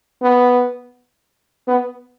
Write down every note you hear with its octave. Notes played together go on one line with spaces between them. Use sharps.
B3
B3